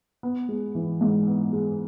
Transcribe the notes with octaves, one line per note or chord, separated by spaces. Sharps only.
B3
G#3
E3
G#2
B3
G#3